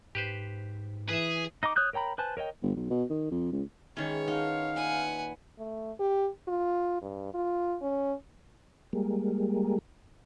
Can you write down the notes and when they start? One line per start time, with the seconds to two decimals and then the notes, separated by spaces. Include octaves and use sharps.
0.15 G#2 G4 B4 C5
1.09 E3 G#4 B4 E5
1.63 D#4 D#5 A#5 D6
1.76 C#5 D#6 F#6 G6
1.93 A#4 C#5 G5 A#5 B5
2.18 B4 C5 G#5 A5
2.37 A#4 C#5 D#5 G5
2.62 G1
2.76 B1
2.90 B2
3.10 D#3
3.31 F2
3.52 C#2
3.97 D#3 E3 G#3 C#4 C#5
4.28 D#4 F4 F5 F#5 A5
4.76 A#2 B4 E5 F#5 G#5
5.59 A3
5.99 G4
6.48 F4
7.02 G2
7.34 F4
7.82 C#4
8.93 G3 G#3 A#3